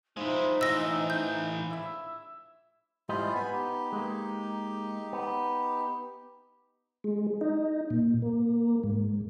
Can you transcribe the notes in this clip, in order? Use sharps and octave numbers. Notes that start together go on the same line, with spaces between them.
F3 G#3 D#4 E4
A2 E3 E6 A#6
G6
E4 E5
G#2 G3 E4 F4 C5 D#5
B3 G#5 B5
D#4 G4
G#3 A#3
B3
G#3
D#4
A#2
A#3
G#2